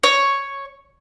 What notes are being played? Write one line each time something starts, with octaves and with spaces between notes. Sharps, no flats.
C#5